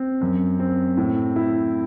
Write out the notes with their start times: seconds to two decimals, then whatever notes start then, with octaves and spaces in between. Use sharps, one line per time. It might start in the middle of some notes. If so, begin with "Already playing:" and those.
Already playing: C4
0.21 F#2
0.59 C4
0.97 A2
1.36 E4